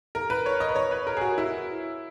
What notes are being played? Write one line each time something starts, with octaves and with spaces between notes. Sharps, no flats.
A#4
B4
C#5
D#5
B4
C#5
B4
A#4
G#4
F#4
E4